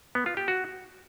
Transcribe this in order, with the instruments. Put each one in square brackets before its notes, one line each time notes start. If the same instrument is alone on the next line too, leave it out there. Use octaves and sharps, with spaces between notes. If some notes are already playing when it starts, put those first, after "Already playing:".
[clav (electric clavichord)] B3
F4
G4
F#4